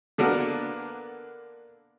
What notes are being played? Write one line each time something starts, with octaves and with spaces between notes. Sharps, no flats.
D3 A#3 B3 D4 A4 A#4